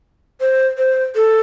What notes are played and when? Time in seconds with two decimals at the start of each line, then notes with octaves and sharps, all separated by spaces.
0.41 C5
0.77 C5
1.16 A4